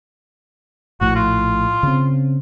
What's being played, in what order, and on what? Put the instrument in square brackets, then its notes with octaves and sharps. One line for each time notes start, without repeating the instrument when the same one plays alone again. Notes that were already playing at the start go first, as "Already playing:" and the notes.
[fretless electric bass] A#1 A2 [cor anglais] F#4
[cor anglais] F4
[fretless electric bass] C#3 C4